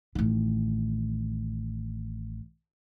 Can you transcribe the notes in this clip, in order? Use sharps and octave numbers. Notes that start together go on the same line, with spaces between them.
A1 D#3